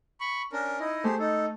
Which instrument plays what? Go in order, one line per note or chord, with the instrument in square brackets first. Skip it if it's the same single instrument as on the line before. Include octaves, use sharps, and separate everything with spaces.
[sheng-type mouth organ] B5 C#6
C#4 D4 A#4
D#4 E4 D#5
[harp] A3 [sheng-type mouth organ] G4 G#4 C5
[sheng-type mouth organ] D#4 A4